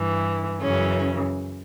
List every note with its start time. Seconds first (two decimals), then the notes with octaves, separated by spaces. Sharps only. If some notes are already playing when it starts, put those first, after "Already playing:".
Already playing: G2 E3
0.61 F#2 C#3 E3 C#4